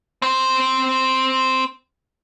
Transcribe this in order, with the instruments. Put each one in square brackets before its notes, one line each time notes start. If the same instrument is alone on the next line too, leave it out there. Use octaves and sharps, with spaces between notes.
[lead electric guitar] C4 C5